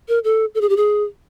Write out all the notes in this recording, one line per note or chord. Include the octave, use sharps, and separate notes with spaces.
A#4
A4
A4
G#4
G4
G#4